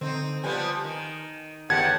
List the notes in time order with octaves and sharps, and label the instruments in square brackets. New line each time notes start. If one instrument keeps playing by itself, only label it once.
[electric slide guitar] D3 [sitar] C4 D#4
[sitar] F3 G3 B3 [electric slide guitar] G#5
[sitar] D#3
[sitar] E2 A2 D#3 [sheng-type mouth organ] G4 F#5 A5 [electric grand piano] G#6